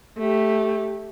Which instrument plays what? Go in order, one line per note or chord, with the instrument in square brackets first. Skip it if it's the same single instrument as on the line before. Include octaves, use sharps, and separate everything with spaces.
[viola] A3 G4